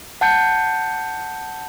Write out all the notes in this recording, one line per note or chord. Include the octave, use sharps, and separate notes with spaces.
F#5 A5 G6 C#7